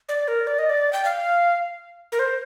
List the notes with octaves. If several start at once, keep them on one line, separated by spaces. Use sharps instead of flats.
D5
A#4
D5
D#5
D5
G5
F5
A#4
C5